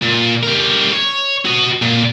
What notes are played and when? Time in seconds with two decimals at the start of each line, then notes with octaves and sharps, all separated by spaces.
0.02 A#2
0.43 G3 A#4
0.93 C#5
1.45 F#4 D#5
1.82 A#2